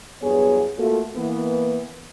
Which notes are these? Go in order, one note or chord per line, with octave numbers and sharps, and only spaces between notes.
E2 G2 F#3 B3 G#4 C#5
A3 A#3 F4 F#4 A4
E3 A#3 B3